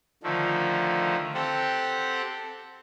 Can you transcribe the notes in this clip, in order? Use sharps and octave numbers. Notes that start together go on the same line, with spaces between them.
D3 D#3 F3 A3
C4 G4 A4 F#5